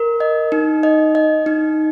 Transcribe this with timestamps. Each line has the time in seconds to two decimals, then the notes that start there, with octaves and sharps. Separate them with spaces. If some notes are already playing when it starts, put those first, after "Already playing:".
Already playing: A#4
0.20 D#5
0.52 D#4
0.83 D#5
1.15 D#5
1.46 D#4